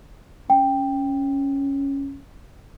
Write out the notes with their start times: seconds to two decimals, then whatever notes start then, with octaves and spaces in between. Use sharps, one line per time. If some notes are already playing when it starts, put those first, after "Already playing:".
0.50 C#4 G5